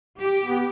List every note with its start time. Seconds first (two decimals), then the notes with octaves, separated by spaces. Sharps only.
0.19 G4
0.45 B3